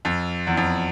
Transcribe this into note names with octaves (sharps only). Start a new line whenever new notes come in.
F2
E2
F2